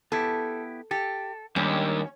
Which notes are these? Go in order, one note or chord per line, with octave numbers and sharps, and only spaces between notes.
B3 E4 G4 A4
G4 A4
D#2 G3 G#3 C#4 D4